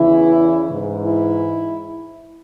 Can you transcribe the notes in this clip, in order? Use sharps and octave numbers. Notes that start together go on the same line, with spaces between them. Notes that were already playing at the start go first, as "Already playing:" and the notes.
Already playing: E2 C#3 E3 E4
G#2 E3
E4